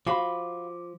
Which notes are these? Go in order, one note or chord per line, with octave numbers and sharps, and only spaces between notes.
F3 F#4 F5 B5 D6